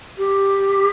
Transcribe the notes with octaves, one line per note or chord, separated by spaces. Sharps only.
G4